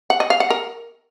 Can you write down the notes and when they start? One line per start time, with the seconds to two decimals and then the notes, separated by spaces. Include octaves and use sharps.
0.10 F#5
0.20 D#5
0.30 F5
0.40 F#5
0.50 A#4